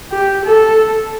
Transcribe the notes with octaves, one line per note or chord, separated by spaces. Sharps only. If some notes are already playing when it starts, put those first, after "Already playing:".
G4
A4